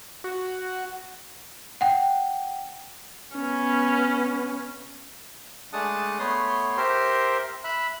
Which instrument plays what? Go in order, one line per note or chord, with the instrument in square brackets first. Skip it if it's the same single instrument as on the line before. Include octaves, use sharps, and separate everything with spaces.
[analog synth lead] F#4
[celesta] F#5 G5
[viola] B3 C#4
[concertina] G#3 A3 D4 F#5 A5 D#6
A3 B3 C#5 C6
G4 A#4 C5 E5 C6
E5 B5 F#6